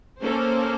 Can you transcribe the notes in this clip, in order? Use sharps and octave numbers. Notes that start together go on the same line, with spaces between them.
A#3 C#4 A4 C5